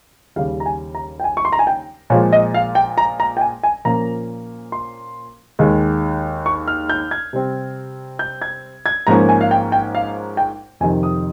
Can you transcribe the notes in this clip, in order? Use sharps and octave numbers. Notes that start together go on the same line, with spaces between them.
D#2 C#3 G3 F5
A#5
G#5
A#5
G5
G#5
C#6
C6
A#5
G#5
G5
A#2 F3 G#3 C#5
D#5
F5
G5
A#5
A#5
G5
G#5
G#5
A#2 F3 A#3 C#4 A#5
C6
D#2 D#3 G#3
C#6
F6
G6
G#6
C3 G3 C4
G6
G#6
G#6
G#2 F3 A#3 C#4 A#5
G#5
F5
G5
G5
F5
G5
F2 C3 D#3 G#5
D#6